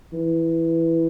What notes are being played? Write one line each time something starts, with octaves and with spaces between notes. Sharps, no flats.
E3